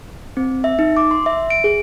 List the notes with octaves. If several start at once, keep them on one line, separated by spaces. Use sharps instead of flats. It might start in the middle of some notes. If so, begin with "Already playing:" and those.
C4
E5
D#4
D6
C6
E5
D7
G#4